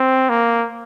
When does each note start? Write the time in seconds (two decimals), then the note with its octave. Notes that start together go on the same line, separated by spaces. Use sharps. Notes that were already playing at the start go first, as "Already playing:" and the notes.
Already playing: C4
0.29 A#3